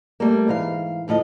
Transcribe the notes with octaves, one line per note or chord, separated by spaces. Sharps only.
G3 A3 A#3
G#2 E3 F5
D2 A2 F3 D#5